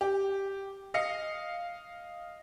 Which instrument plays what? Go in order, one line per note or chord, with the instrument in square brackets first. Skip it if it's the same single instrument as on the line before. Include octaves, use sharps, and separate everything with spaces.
[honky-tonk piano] G4
D#5 F5 C#7